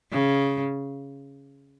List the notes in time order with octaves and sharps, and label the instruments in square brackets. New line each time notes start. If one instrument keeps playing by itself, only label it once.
[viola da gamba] C#3